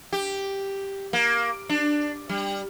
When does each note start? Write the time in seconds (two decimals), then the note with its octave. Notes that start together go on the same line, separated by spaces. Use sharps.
0.13 G4
1.13 A#3
1.69 D4
2.29 G3